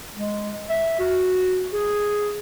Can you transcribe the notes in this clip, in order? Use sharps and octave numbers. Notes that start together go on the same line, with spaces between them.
G#3
E5
F#4
G#4